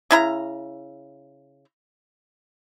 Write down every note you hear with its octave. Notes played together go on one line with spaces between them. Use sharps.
C#3 E4 A#5